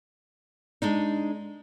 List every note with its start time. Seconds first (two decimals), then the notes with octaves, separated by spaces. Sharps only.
0.82 G#3 D4 D#4